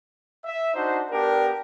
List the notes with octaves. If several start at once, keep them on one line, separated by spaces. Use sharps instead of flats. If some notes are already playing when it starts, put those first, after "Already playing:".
E5
D4 D#4 F#4 C5
B3 D4 G4 A#4